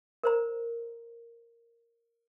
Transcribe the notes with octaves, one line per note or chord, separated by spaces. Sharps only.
A#4 C5 A#5